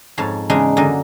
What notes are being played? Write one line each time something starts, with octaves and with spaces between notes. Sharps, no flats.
F2 G#2 C#5 F5 A5
E2 C#3 G#3 D4 D#4
F#2 D3 A#3 D#5